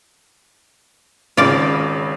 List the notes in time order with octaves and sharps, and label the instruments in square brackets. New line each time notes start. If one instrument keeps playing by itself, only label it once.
[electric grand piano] G#1 C#3 [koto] F4 D5